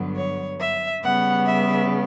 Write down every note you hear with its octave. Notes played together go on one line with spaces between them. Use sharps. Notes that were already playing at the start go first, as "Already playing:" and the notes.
Already playing: G2 D3 F#3 B3
C#5
E5
C#3 G3 B3 F#5
E5